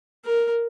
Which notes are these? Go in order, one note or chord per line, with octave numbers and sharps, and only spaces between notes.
A#4